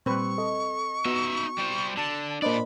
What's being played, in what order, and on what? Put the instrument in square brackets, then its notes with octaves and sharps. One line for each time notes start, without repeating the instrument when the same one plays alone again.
[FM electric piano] A#2 G3 [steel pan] C4 B4 [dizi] C#6
[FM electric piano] A4 D#5
[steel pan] B3 [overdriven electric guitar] D#4 E5 [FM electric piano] F#4
[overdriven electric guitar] G3 C5
[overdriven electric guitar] D3 [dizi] A5
[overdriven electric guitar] A#2 D5 [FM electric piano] A#3 C5 D#5 [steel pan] D4 [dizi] B5